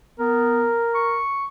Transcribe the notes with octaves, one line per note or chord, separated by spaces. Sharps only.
B3 A#4
C#6